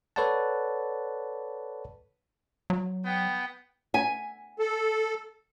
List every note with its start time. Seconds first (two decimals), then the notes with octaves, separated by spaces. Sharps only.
0.16 A4 B4 C#5 D5 F#5 A5
2.70 F#3
3.05 B3 G5
3.94 E5 G#5
4.59 A4